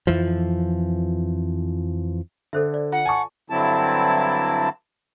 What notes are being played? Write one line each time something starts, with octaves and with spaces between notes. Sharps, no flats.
F2 E3 F3
D3 A4 C5 E5
D5
F4 F#5
G#5 A5 C#6
G2 D3 F#3 C4 E4 A5